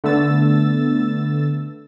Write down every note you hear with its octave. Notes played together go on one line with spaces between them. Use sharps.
D3 A3 B3 E6 A6